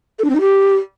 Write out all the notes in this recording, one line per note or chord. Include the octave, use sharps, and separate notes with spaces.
A4
D4
C4
D#4
G4